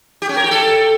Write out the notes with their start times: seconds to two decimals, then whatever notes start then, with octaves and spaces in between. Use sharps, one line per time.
0.22 G4
0.29 C#4
0.37 A#4
0.44 G4
0.51 A4